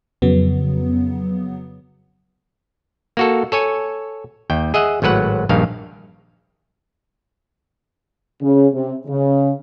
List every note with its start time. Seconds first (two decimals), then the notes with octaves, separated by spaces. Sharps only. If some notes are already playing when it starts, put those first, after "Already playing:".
0.22 F2 C#3 F#3 B3
3.17 A#3 F#4 A4
3.52 A4 C#5 G#5
4.50 D#2 G5
4.74 G#4 D#5 E5 F#5
5.02 G#1 A2 F#3 B4 F#5
5.49 A#1 G2 D#3 F5
8.42 C#3
8.73 C3
9.08 C#3